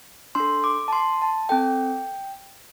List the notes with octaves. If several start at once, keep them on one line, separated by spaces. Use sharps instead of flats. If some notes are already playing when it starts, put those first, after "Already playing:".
D4 A4 C6
D6
A5
C6
A5
C4 A4 G5